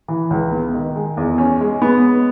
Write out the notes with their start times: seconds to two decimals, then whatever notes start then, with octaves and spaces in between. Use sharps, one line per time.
0.08 E3
0.31 C#2
0.52 B3
0.74 D#3
0.96 G#3
1.17 E2
1.38 C#4
1.61 G#3
1.82 B3